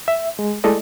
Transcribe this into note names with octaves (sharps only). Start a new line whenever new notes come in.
E5
G#3
G#3 A3 E4 A4 D5 D#5